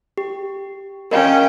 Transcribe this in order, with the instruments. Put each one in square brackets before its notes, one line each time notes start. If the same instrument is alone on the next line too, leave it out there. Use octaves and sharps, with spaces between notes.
[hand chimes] G4
[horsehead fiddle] C#4 G5 [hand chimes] A#4 D#5 F5